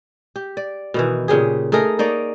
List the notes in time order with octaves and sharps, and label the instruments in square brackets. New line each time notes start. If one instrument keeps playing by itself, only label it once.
[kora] G4
D5
B2 D#3 E3
A#2 C#3 G4 G#4
A3 D#4 G#4 A#4
A#3 D#4 C#5 D5